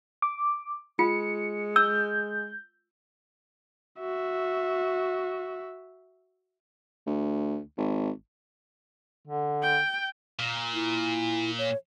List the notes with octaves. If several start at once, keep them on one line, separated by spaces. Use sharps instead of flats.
D6
G#3 F4 C#7
E6 G6
F#4 E5
D2
G#1
D3
G5
A#2
E4
C#5